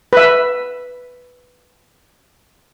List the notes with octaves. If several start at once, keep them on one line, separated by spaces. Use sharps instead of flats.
B4 E5